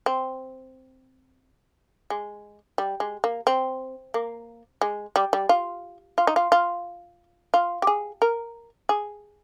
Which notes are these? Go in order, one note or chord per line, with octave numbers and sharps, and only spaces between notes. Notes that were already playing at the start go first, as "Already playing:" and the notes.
C4
G#3
G3
G#3
A#3
C4
A#3
G#3
G3
G3
F4
F4
D#4
F4
F4
F4
G4
G#4
A#4
G#4